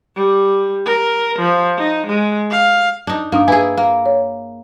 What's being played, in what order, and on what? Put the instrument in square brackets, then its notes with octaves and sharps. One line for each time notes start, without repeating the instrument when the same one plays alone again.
[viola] G3
A#4
F3
D#4
G#3
F5
[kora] D4 D#4
[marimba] G2 D4 D#6 [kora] A#3
[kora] E4 G#4 [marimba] B4 G#5
[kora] A#3
[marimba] C#5